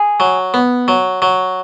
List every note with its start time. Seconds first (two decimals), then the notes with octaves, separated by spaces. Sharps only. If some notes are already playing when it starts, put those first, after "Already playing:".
Already playing: G#4
0.20 F#3
0.54 B3
0.88 F#3
1.22 F#3